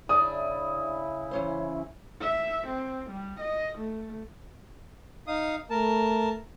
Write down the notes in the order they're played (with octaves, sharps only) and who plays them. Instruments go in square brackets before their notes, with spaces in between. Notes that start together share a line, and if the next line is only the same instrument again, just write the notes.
[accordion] C#3 E4 [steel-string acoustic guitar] D4 D5 E5 [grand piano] D#6
[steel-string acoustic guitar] E3 C#4 C5
[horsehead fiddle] E5
C4
G3
D#5
A3
[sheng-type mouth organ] D#4 F5 D#6
[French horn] A3 [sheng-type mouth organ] A#4 A5